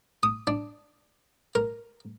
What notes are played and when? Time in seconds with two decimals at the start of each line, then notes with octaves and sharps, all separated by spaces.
0.23 D#6
0.47 D4
1.55 A#4